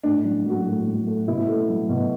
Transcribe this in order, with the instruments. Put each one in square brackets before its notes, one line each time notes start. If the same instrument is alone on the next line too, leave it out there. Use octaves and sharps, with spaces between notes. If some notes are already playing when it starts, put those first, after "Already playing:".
[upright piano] A2 D4
F#3
F#3 F#4
A2
F#3
A3
B2 E4
A3
F#3
B2